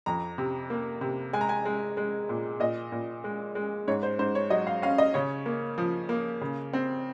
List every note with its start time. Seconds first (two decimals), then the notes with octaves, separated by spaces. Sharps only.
0.06 F2 A#5
0.38 C3
0.70 A#3
1.01 C3
1.33 G#3 G#5
1.41 A#5
1.49 G#5
1.65 G#3
1.97 G#3
2.29 A#2
2.60 A#2 D#5
2.92 A#2
3.24 G#3
3.55 G#3
3.88 G#2 C#5
4.03 C5
4.19 G#2 C5
4.35 C#5
4.50 F#3 D#5
4.67 F5
4.82 C#4 F5
4.98 D#5
5.14 C#3 C#5
5.46 A#3
5.78 F3
6.09 A#3
6.41 C#3
6.73 C4